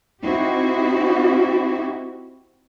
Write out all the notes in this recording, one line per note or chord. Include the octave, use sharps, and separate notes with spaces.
C4 D#4 E4 F#4 G4